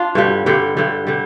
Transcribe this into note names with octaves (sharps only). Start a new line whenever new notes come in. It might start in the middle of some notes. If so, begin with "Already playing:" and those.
Already playing: D4 F4
G2 D3 G3
G2 D3 G3
G2 D3 G3
D3 G3